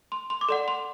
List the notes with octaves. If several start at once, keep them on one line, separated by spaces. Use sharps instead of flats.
C6
C6
D6
A4 D5 F#5 C6
C6